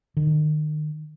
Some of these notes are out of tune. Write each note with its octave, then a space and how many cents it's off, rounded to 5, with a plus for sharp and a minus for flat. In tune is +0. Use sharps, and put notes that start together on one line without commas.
D#3 -35